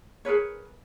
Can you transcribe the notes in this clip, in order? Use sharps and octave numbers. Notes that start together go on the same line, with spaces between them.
G#4 A#4 B4 C#5